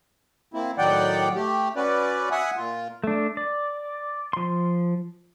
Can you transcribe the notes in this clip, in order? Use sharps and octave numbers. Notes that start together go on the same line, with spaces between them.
A#3 C4 E4
A2 D#3 F#3 D5 F#5 G5
A3 G4
C#4 F#4 B4 D5
E5 F#5 G#5 D#6
A#2 F4
A3 D4
D5
F3 C6